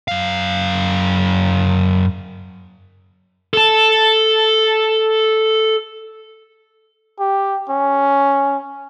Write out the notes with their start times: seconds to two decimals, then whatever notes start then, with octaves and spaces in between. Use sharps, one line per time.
0.08 F#2 F5
3.54 A4 A5
7.19 G4
7.69 C#4